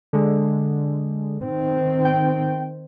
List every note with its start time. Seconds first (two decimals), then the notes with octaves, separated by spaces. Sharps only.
0.13 D3 G#3
1.39 D#3 C4
2.05 G5